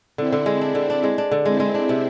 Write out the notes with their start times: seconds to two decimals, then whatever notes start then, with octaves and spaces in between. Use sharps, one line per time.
0.18 D3 C4 E4
0.32 D3
0.46 G#3
0.60 C4 D4 E4
0.75 D3
0.90 D4
1.04 G#3
1.18 D4
1.32 D3
1.45 G#3 C4 E4
1.60 G#3
1.74 D4
1.89 C3